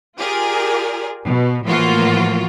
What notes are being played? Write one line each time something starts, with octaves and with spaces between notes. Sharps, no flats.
F4 G4 G#4 A#4 D5
B2
A2 E3 F3 A#3 F4 F#4